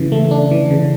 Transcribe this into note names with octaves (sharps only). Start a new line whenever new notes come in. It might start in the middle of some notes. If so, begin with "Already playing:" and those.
Already playing: C#3 E3
A3
D4
E3
C#3